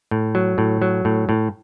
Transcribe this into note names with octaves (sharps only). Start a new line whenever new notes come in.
A2
F#3
A2
F#3
A2
A2